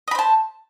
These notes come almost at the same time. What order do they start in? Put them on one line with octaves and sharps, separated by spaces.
D#5 B5 C5 A5